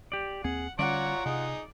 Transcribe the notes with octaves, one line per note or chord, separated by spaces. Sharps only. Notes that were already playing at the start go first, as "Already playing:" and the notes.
G4 D5
D#2 C4 G#4 F#5
D3 G3 C#4 F4 C#5 D5 F#5 A#5
C3 D#4 G#4